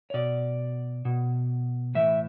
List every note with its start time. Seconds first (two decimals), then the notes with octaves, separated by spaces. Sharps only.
0.10 C#5
0.14 B2 D5
1.05 B2
1.95 A2 E3 E5